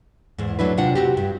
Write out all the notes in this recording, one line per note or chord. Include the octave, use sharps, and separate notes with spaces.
E2 G#2
F#3 A3 D4 E4 B4
C3 D4 F4 F#5
C4 F#4 G4
G2